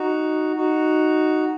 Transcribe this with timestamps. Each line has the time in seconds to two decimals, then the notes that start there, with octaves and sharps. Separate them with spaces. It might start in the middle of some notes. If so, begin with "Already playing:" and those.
Already playing: D#4 F#4
0.56 D#4 F#4